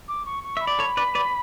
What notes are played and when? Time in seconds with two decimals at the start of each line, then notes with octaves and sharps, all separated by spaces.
0.08 D6
0.26 C#6
0.44 C#6
0.57 E5 B5
0.67 D5
0.79 A4 C#5
0.97 B4 D5
1.15 B4 D5